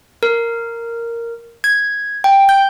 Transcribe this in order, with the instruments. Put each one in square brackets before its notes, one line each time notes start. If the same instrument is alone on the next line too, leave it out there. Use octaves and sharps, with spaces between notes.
[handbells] A#4
G#6
G5
G6